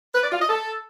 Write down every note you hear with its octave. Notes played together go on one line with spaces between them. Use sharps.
B4
D5
F4
D#5
A4